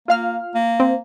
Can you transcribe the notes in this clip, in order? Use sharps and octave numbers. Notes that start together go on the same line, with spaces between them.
A#3 F4 F5 F6
A#3
C4